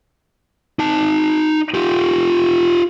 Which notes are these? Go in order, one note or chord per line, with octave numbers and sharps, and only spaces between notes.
D#4 A5
F4 G4